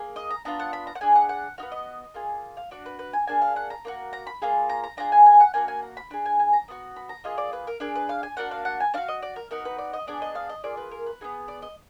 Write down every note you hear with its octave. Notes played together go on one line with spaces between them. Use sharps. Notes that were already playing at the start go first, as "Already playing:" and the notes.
Already playing: A#3 G#4
D#5
A#5
B3 D4 F4 A#5
F#5
B5
A#5
F#5
D4 G#4 G#5
F#5
F#5
B3 D#4 F#4 F5
D#5
A#3 F4 G#4
F5
D4 F#4 D5
B4
B4
G#5
A#3 D4 G#4 G#5
F5
F#5
A#5
A#3 D#4 F#4
A#5
B5
A#3 F4 G#4
A#5
A#5
D4 F4 G#4 A#5
G#5
G#5
F#5
A#3 D4 F#4 G#5
G#5
A#5
B5
D4 G#4 B5
G#5
G#5
A#5
B3 D4 F#4
B5
A#5
A#3 F4 G#4 D#5
D5
B4
A#4
D4 G#4 A#4
B4
F5
G#5
A#3 D4 F#4 F#5
F5
F#5
G#5
D4 F#4 F5
D#5
D5
A#4
B3 D#4 F#4 A#4
B4
D5
D#5
B3 D4 G#4 D5
D#5
F5
D#5
A#3 F4 G#4 D5
B4
A#4
B4
B3 D#4 G#4
D5
D#5